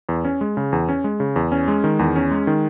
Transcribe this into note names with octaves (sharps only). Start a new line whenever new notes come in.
E2
C#4
G#3
C#3
E2
C#4
G#3
C#3
E2
C#4
G#3
D#3
E2
C#4
G#3
D#3